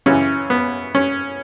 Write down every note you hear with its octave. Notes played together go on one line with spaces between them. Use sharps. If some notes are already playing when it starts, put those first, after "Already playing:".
F#2 C#3 E3 C#4
B3
C#4